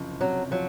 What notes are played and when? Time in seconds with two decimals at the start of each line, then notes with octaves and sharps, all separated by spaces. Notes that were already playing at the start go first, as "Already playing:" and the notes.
Already playing: F#1 C3 F3
0.20 C3 F#3
0.51 F3 F#3